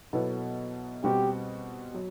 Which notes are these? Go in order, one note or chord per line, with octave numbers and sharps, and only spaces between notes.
B2 F#3 B3 E4 A4
B2 G3 C4 F#4 G4
F#3